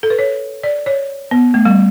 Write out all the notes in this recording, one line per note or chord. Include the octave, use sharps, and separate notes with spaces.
A4
B4
C#5
D5
C#5
B3
A3
G3